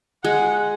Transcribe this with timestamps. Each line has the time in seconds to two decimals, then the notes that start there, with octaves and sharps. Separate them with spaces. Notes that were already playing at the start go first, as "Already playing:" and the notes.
0.24 G#3 F#5